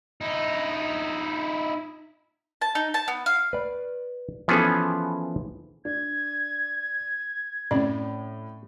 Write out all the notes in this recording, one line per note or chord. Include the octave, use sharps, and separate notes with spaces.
D#4 E4
A5
D#4
A5
B3
F5
B4 D5
E3 F3 B3 C#4 G#4 A4
D4 G#6
A2 C4 C#4 D5